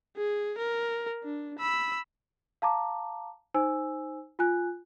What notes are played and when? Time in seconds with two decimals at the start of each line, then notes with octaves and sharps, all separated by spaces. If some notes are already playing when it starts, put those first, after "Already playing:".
0.17 G#4
0.58 A#4
1.23 D4
1.59 B5 E6
2.62 F5 A5 A#5 D6
3.54 D#4 C5 G#5 E6
4.39 F4 G#5 F#6